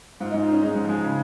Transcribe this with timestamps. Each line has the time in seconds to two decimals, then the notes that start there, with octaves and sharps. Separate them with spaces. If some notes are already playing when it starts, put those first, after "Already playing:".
0.20 G#2 F4
0.31 D#4
0.34 G#2
0.42 F4
0.48 C#4 D#4
0.62 G#3 D#4
0.75 G#2
0.83 F3
0.89 G#3
1.04 C#3